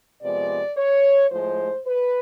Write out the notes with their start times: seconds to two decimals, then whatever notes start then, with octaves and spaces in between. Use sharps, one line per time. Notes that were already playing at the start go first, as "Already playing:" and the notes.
0.22 C3 F3 G#3 B3 D5
0.77 C#5
1.31 A2 F3 G#3 C5
1.86 B4